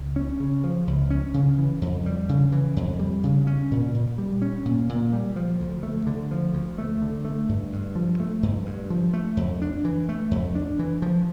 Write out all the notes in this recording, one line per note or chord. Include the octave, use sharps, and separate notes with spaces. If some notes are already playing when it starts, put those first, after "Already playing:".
Already playing: C#2
C#4
C#3
F3
C#2
C#4
C#3
E3
F2
G3
C#3
E3
F2
G3
C#3
C#4
A#2
A#2
G3
C#4
A#2
A#2
G3
F3
D2
A3
D3
F3
D2
A3
D3
A3
G2
G2
F3
A3
G2
G2
F3
A3
F2
D4
E3
A3
F2
D4
E3
F3